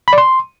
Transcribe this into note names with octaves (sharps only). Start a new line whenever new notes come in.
B5
D5
C6